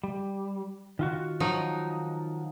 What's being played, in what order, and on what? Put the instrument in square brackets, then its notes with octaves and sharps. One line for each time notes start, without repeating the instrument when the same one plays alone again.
[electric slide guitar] G3
D#3 F4 F#4
[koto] F3 F#3 D#4